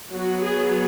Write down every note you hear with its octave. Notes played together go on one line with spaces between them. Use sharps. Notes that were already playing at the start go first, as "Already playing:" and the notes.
F#3 B3 F#4
G#4